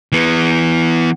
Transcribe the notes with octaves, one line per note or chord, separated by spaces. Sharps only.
E3 B3